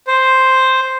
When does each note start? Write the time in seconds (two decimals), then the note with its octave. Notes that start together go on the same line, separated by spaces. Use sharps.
0.07 C5